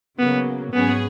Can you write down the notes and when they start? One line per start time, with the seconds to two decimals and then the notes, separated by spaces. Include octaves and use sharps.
0.19 C#3 F#3 A#3 B3
0.74 G#2 F#3 B3 C#4 G#4 B4